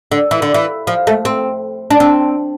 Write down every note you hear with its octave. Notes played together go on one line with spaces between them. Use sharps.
D3
E3
D3
E3
F3
A3
C4
D4
C4